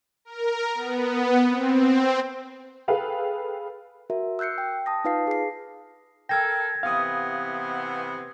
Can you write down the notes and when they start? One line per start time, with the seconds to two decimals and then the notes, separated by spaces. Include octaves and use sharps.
0.25 A#4
0.75 B3
1.46 C4
2.88 G#4 A4 B4 F5 G5
4.10 F#4 A#4 E5
4.39 E6 F#6 G6 C7 C#7
4.58 G5
4.86 A5 D#6 A#6
5.05 D#4 F4 B4 F5 A5 C7
5.27 G#4 C7
6.29 A4 A#4 G5 E6 G#6 A#6
6.83 C3 E3 B3 F5 D#6